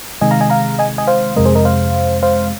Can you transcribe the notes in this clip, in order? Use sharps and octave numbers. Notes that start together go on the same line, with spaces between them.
C3 D#3 G#3 D#5 G#5
F5 A#5
D#5 G#5
F5 A#5
D#5 G#5
D#5 G#5
C5 F5
F2 C3 G#3 A#4 D#5
G#4 C5
A#4 D#5
C5 F5
C5 F5